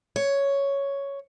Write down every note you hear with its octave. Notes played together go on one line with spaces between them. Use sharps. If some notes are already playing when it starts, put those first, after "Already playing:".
C#5